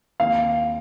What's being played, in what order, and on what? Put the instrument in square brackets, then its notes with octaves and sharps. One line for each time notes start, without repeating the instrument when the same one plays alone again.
[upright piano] D#2 F5